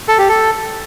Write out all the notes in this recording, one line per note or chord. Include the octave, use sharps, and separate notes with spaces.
A4
G4
A4